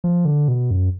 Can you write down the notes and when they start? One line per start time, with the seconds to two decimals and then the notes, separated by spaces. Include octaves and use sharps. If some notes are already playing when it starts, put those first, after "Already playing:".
0.04 F3
0.25 D3
0.48 B2
0.71 F#2